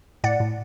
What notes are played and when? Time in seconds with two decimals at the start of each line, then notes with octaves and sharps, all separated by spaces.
0.24 A2 D5 F#5
0.40 A2